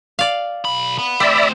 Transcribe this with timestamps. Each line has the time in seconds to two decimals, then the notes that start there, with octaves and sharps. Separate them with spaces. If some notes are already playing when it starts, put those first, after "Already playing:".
0.19 D5 F5
0.65 B1 B5
0.99 F#5 B5
1.20 A3 C4 C5 D5 E5 B5